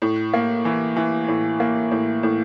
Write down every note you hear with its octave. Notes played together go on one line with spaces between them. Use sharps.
A2
A#3
E3
E3
A2
A#3
A2
A2